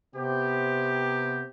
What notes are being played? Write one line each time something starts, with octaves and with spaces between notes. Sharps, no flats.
C3 B3 G4